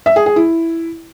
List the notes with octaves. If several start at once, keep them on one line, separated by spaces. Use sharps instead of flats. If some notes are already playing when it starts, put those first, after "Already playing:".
E5
G#4
G#4
E4